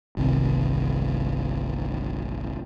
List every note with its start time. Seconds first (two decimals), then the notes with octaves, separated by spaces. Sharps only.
0.17 G1 C2 C3 D#3